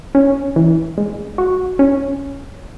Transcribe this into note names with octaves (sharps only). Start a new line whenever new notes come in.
C#4
E3
G#3
F#4
C#4